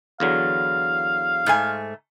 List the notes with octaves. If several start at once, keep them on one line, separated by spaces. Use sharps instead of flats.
E2 D3 F#3 F5
G#2 A3 G#5